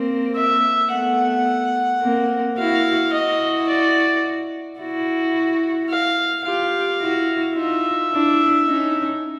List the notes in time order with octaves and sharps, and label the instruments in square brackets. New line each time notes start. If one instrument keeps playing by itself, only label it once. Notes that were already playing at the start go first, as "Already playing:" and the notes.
Already playing: [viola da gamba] A#3 C4
[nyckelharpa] E5
[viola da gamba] A3 B3 [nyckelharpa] F#5
[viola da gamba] A#3 C4
[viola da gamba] E4 F#4 [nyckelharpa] F5
[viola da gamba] E4 F#4 [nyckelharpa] D#5
[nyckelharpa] D5
[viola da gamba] E4 F#4
[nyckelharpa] F5
[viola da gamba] F4 G4 [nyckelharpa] F5
[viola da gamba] E4 F#4
[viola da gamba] D#4 F4 [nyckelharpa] E5
[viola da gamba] D4 E4
C#4 D#4